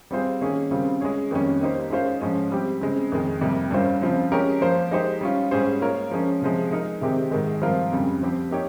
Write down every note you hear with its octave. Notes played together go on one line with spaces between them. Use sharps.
G3 C4 F4 G#4 C5
D#3 A#3 C#4 G#4
C#3 G3 C4 F4
G#3 C#4 G#4 C#5
F2 D#3 G3 A#3 C#4
A#3 D#4 G4 C5
G#3 C#4 F4 C5 F5
G#2 F3 G#3 C#4
G3 C4 G4
C#3 G#3 C4
F2 D#3 G#3
F2 C3 G3 A#3
G2 G3 C#4 F4 C5
C#3 F3 C4 F4
G#3 C#4 G4 A#4 C#5
F3 A#3 F4 C5
G#3 D#4 G4 C5
G3 C#4 F4
G#2 G3 C#4 G#4 C5
A#3 F4 A#4 C#5 F5
F3 G#3 C#4
C3 F3 G#3
G#3 D#4 A#4
C3 D#3 G#3 C4 G4
G#2 D#3 G#3
G2 F3 C4 F4 A#4
F2 C#3 G3
F3 C4 G4 C5
A#3 D#4 G4 C#5